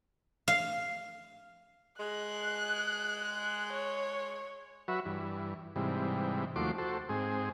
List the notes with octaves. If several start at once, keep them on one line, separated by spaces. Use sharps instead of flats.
F5
G#3 F#6
C#5
F#3 F#4 B4 E5
G2 E3
G#2 C3 E3 G3
D#2 F3 A3 F#4 C6 D6
F#4 A4 C5
G#2 C4 G#4